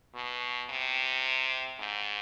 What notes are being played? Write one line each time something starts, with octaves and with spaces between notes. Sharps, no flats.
B2
C3
G#2